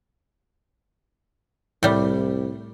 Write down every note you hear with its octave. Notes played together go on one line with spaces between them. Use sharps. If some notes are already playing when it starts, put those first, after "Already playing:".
C2 A2 G3